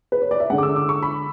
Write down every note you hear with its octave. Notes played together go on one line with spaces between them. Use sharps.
B4
C#5
D5
E5
D3 G#3 F#5
D6
E6
D6
C#6
B5